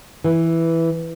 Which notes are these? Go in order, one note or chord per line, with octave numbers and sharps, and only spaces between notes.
E3